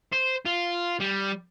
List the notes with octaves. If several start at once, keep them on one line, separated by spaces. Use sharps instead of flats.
C5
F4
G3